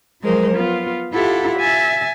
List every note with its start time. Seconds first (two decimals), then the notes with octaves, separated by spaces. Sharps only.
0.22 F3 F#3 G#3 G#4 A#4 C5
0.56 B3 F4
1.13 E4 F4 G4 A4 F#5
1.59 E5 G#5 A6